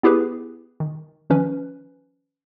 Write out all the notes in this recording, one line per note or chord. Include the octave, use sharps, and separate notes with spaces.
B3 E4 G4 G#4 B4
D#3
D#3 F3 C#4 B4